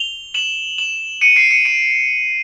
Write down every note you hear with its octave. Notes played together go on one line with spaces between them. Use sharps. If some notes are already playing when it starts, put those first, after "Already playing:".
Already playing: F7 G7
E7 F#7
E7 F#7
C#7 D#7
C7 D7
C#7 D#7
D7 E7